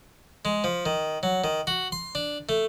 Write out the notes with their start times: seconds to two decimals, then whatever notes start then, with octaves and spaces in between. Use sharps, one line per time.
0.45 G#3
0.64 F3
0.86 D#3
1.23 F#3
1.44 D#3
1.67 F#4
1.92 C6
2.15 D4
2.49 A3